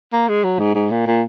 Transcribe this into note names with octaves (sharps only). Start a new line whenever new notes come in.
A#3
G#3
F#3
G#2
G#2
A#2
A#2